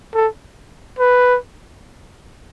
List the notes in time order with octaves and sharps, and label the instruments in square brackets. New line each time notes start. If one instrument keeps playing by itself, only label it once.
[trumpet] A4
B4